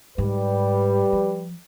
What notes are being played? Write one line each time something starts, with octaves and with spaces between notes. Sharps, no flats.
G#2 G3 B4
F3